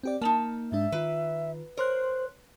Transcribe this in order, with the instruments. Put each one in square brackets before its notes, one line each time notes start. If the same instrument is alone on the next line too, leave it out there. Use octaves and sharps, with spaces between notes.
[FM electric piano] C4 G4 D5
[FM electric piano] A#3 [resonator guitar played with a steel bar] D#4 A5
[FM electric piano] G#2 G#3 D4 [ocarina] E5
[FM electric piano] D#3 F4 [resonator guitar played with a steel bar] B4
[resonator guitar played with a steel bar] A#4 [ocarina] C5 [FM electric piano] C#5 C6 F#6